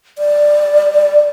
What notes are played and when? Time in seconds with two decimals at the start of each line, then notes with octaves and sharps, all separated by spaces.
0.18 D5